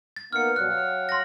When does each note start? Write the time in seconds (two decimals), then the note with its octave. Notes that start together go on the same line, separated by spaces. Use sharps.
0.16 A6
0.33 A#3 B3 D#4 F6 C#7
0.56 B2 F#3 G3 F#6
0.68 F#3 F5 G5
1.09 C6 A#6